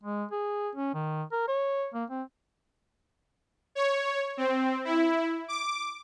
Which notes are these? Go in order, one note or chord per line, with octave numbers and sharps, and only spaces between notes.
G#3
G#4
C#4
D#3
A#4
C#5
A#3
C4
C#5
C4
E4
D6